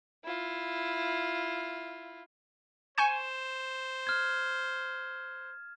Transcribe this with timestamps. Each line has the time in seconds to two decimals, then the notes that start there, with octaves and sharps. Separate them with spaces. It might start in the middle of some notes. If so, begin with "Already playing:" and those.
0.24 E4 F4
2.98 C5 G#5 C#6 G6 E7
4.07 F6 G#6